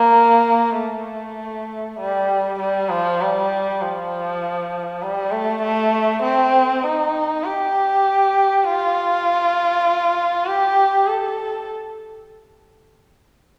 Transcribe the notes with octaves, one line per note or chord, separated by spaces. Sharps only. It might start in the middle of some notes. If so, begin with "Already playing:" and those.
Already playing: A#3
A3
G3
G3
F3
G3
F3
G3
A3
A3
C4
D#4
G4
F4
G4
A4